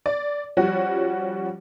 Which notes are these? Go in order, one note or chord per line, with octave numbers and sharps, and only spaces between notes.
D5
F3 G3 C#4 F#4